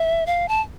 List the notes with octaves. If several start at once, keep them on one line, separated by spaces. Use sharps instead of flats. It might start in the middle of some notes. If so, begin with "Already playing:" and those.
Already playing: E5
F5
A5